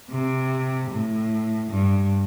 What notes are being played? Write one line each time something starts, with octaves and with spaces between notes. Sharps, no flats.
C3
A2
G2